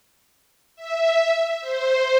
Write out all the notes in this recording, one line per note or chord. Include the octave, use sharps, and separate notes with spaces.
E5
C5